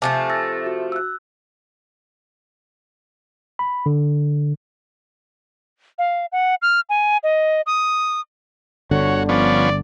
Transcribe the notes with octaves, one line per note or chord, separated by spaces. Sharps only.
C3 F3 A3 E5 G#5 A5
E6 A6 A#6
F#4
E6 F#6
B5
D3
F5
F#5
F6
G#5
D#5
D#6
G1 D3 F#4 C#5
F3 B3 C#4 D5